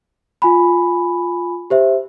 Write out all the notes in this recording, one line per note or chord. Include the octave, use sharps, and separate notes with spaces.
F4 G#5 B5
G4 C5 E5